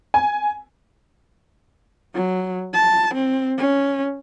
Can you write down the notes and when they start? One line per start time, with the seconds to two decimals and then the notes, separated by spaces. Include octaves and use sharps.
0.14 G#5
2.15 F#3
2.74 A5
3.15 C4
3.58 C#4